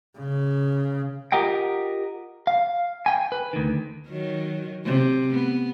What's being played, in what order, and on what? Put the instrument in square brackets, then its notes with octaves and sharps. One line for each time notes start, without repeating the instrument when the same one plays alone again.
[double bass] C#3
[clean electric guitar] F4 G4 A#4 D#5 F#5 G5
F5
G5 G#5
B4
D2 D#3
[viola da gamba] D#3 F#3
C3
B3